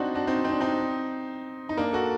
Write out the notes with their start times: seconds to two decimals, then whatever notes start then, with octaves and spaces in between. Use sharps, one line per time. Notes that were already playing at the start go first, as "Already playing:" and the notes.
Already playing: C4 D4 D#4 F#4
0.15 D4 F#4
0.27 C4 D#4
0.44 C4 D#4
0.52 D4
0.60 C4 D#4
1.69 D#4
1.77 A#3 D4
1.93 F#4 A4